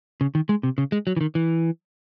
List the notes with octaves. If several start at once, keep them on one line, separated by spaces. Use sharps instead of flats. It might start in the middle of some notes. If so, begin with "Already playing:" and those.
C#3
D#3
G#3
C3
C#3
G#3
F#3
E3
D#3
E3